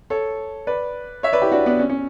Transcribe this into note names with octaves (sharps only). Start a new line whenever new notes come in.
A4 C#5
B4 D5
C#5 E5
B4 D5
E4 G4
D4 F#4
B3 D4
C#4
C#4